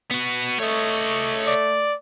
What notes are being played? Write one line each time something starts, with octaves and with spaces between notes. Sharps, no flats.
B3 F#4
A3 C#5 D#5
D5